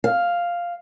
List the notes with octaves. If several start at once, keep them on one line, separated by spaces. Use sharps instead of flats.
F5